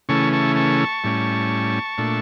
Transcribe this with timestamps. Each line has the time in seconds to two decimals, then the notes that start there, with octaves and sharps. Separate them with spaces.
0.09 C#3 E3 A3 C#4 A5 C#6
0.33 A5 C#6
0.56 A5 C#6
1.04 A2 G3 C#4
1.98 A#2 A3 D4